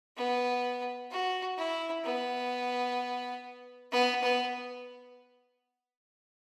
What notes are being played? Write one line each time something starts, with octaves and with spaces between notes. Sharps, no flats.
B3
F#4
E4
B3
B3
B3